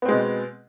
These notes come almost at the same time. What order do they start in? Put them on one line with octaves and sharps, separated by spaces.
B3 C4 G#3 B2